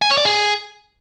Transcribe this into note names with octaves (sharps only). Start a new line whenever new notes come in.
G#5
C#5
D5
G#4